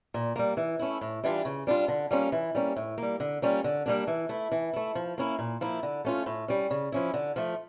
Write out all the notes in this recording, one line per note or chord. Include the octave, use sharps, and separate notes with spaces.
A#2
G3 A#3
E3
A3 C#4 E4
A2
E3 G3 D4 F4
C#3
G3 D4 F4
D3
G3 A#3 C#4 F4
E3
G3 A#3 C#4
A2
G3 A#3
D3
G3 A#3 C#4 F4
D3
G3 A#3 D4
E3
A3 E4
E3
A3 E4
F3
A#3 C#4 E4
A#2
F3 A#3 E4
D3
A3 C#4 F4
A2
G3 C#4
C#3
F3 C#4 E4
D3
F3 A3